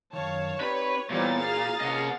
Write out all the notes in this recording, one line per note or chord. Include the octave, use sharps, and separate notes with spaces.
F#2 D#3 C#5 F5 A5
C4 D#4 G4 B4 D5
A#2 E3 G3 B3 C4 C#5 A#5 A6
F#4 G#4 F5
C3 A#3 C#4 D#5 F#5